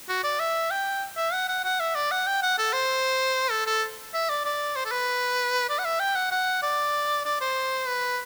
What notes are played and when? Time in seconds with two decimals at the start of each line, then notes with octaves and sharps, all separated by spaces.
0.09 F#4
0.24 D5
0.40 E5
0.71 G5
1.17 E5
1.33 F#5
1.49 F#5
1.65 F#5
1.80 E5
1.95 D5
2.11 F#5
2.27 G5
2.43 F#5
2.58 A4
2.73 C5
3.51 A4
3.67 A4
4.14 E5
4.30 D5
4.45 D5
4.76 C5
4.86 A4
4.91 B4
5.70 D5
5.79 F#5
5.85 E5
6.00 G5
6.16 F#5
6.31 F#5
6.63 D5
7.25 D5
7.41 C5
7.87 B4